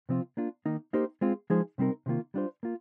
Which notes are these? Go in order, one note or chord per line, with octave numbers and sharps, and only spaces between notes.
C3 F3 C4 F4
A#3 D4 F4
D#3 A#3 D#4
A#3 D#4 G4 C5
G#3 C4 F4
F3 G#3 D#4 G#4 C5
C3 G3 C4 D#4 A#4
C3 D#3 A#3 F4
G3 D4 F4 C5
A#3 F4